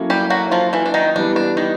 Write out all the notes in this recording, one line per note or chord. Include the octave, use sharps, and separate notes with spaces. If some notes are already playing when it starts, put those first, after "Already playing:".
Already playing: F#3 A#3 C#4 E4 A4
G3 G4
F#3 F#4
F3 F4
E3 E4
D4
D#3 D#4
E3 G3 B3 D4
D4
D#3 D#4